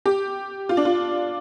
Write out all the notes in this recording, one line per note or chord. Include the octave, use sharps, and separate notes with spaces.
G4
F4
D4
F4